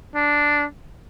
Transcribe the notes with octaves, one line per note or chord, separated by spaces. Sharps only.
D4